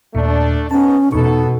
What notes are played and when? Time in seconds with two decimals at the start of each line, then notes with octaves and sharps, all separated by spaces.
0.15 D#2 A#2 A3 D4
0.71 G#2 B3 C#4 A5
1.12 E2 B2 B3 D#4 A4 C#6